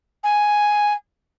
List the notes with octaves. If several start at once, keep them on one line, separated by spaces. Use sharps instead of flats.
G#5